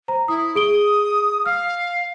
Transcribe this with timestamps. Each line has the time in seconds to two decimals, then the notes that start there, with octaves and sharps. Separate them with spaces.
0.08 C5 A#5
0.28 E4 D#6
0.55 G#4 D#6 D7 G7
1.46 F5 F6